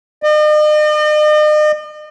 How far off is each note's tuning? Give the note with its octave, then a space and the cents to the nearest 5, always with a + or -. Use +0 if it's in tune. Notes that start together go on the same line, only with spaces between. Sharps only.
D#5 -45